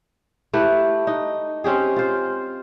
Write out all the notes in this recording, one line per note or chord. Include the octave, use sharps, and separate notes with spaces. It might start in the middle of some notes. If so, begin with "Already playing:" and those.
A3 E4 G4 B4
D#4
C4 C#4 G4 G#4
F4 C5